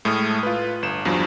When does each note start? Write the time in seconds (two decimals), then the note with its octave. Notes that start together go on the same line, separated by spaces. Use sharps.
0.05 A2 G#3 A3 D#6 F6
0.43 F4 B4
0.82 G1 E7
1.05 E2 G2 F3 F#3